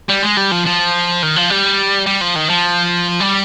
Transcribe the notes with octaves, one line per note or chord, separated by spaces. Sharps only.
G3
G#3
G3
F3
F3
D#3
F3
G3
G3
F3
D#3
F3
G3